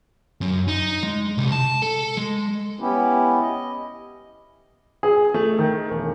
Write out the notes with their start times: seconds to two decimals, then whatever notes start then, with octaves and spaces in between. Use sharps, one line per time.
0.41 F#2
0.68 D#4
1.03 G#3
1.38 C2
1.52 A5
1.82 A4
2.17 G#3
2.80 B3 C#4 E4 G4
3.41 D#5
5.03 G#4
5.34 A3
5.59 D#3
5.91 E1